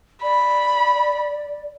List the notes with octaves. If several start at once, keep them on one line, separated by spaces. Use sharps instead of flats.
D5 B5